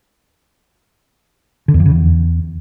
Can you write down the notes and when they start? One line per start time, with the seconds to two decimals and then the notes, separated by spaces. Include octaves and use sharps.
1.68 D3
1.74 E2
1.80 F2
1.86 C#3
1.91 E2